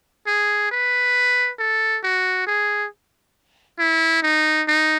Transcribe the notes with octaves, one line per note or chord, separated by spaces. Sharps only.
G#4
B4
A4
F#4
G#4
E4
D#4
D#4